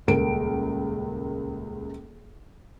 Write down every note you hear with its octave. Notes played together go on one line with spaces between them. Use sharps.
D#1 C#2 A#4 D7